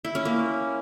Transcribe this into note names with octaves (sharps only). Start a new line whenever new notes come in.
E4
C#4
A#3